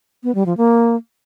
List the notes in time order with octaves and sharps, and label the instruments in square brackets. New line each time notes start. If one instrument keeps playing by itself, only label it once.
[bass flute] B3
G3
F3
A#3